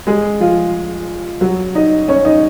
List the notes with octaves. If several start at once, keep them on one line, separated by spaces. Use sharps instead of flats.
G#3 G#4
F3 F4
F#3 F#4
D#4 D#5
C#4 C#5
D#4 D#5